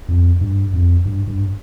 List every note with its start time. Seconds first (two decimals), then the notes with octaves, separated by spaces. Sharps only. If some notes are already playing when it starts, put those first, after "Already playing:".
0.08 F2
0.41 G2
0.73 F2
1.05 G2
1.27 G2